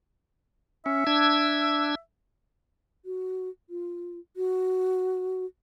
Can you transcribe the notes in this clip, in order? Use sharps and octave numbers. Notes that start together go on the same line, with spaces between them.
C#4 E5
D4 E6 G#6
F#4
F4
F#4